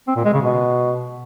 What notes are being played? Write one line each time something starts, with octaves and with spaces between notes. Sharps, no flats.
C4
A#2
G#3
C#3
B2